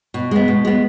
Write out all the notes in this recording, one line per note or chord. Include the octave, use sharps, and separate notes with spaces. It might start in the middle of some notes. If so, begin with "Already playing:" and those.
B2
G#3 B3
B2
G#3 B3